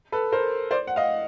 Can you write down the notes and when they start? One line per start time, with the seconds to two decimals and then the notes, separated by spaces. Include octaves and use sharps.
0.12 A4 B4
0.32 A#4 C5
0.71 C5 D5
0.87 F#5
0.96 D#5 F5